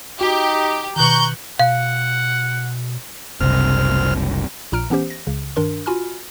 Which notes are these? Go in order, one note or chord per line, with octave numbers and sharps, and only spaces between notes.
D#4 F#4 G4
B2 D#3 A#5 C#6 F#6 G6
B2 F5 F#5
F#1 C2 C3 F6
A#1 A#2 A#5 F6 D7
E3 B3 C#4 G4 C5
A#6
C#2 C#3
G2 D#3 D4 A#4 C6
F4 F#4 G#5 B5 F6